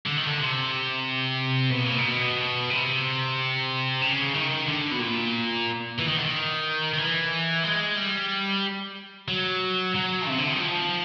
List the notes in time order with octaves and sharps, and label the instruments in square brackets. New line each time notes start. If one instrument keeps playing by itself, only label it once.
[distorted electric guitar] D3
D#3
D3
C3
B2
A#2
B2
C3
C#3
D#3
D3
B2
A#2
E3
D#3
D3
D#3
D#3
E3
G#3
G3
F#3
F#3
C3
D3
D#3
F3